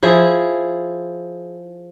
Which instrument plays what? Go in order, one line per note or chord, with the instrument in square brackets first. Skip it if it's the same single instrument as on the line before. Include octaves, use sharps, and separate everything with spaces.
[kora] F3 E4 G#4